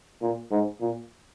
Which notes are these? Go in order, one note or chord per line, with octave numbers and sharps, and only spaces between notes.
A#2
G#2
A#2